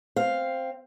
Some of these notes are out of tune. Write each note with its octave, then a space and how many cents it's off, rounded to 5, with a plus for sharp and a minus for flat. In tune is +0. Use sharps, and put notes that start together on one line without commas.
C4 +5 F5 +0